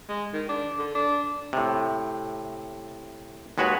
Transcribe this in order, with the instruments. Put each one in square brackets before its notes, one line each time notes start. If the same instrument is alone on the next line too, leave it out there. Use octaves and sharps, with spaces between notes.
[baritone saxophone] G#3
D#3
D4
D3
D4
[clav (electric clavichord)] A2 C3
D#2 G#3 F#4 B4 C#5